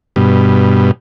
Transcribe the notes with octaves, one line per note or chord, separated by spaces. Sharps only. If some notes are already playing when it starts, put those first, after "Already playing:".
G2 B2